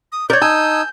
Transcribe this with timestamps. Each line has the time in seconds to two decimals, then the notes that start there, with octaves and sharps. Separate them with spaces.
0.12 D#6
0.30 A#4 C#5 D5 G6
0.42 D#4 G#5 A5 D#6 E6 G#6